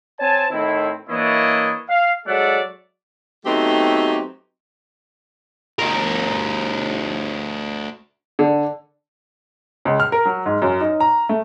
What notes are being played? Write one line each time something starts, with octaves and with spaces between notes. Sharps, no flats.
C4 C#5 G#5 A5
A2 D#3 C4 E4
E3 A#3 D4 E4 C#5 D#5
F5
F#3 G#3 A4 D5 E5 F#5
F#3 A3 B3 C4 D#4 G4
D2 A#4
D3
C#2
F6
A#4
F#3
G#2
F#2
D#4
A#5
A3